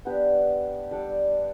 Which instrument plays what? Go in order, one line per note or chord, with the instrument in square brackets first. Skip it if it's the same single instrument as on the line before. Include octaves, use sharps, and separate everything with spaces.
[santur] B3 D4 G4
G3 D4 A4 D5